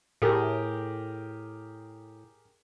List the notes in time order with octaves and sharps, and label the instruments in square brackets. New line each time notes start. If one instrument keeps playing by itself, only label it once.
[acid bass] A2 [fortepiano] G4 G#4 A#4